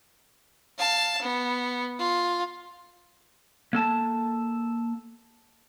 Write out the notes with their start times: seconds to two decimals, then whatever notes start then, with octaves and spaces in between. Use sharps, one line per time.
0.78 F5 A5
1.22 B3
1.99 F4
3.73 A#3 A4 A5